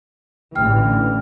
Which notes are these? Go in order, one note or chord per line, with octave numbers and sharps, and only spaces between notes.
A1 D3 E3 G5 F6